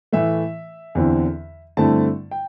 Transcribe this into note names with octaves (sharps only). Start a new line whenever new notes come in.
A2 E3 A3 E5
E2 D3 C4 E4
G2 D3 A3 C4 E4 A5
G5